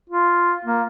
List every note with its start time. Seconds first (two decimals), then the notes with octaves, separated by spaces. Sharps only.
0.09 F4
0.65 A#3